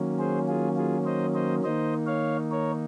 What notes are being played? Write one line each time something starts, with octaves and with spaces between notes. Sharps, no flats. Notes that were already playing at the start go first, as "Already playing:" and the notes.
Already playing: D#3 F#3 A#3 C#4
G#4 C5
F4 G#4
F4 G#4
C5 D#5
C5 D#5
D#3 A#3 D#4 C5 D#5
C#5 F5
A#4 C#5